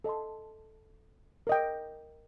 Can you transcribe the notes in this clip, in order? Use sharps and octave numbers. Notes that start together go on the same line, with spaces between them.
A4 D#5 A5 C6
A#4 D#5 G5